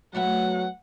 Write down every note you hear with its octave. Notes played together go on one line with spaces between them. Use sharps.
F#3 A3 B3 E5 F#5